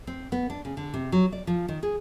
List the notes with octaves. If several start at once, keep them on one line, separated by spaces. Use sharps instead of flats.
C4
B3
D4
C#3
D3
C3
F#3
D5
F3
D#3
G#4